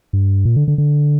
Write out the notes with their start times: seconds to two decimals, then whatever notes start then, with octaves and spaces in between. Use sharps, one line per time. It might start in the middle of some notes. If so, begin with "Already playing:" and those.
0.13 G2
0.45 A#2
0.56 D3
0.68 D3
0.78 D3